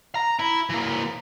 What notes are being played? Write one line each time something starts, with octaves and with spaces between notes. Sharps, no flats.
A#5
E4
E3 A#3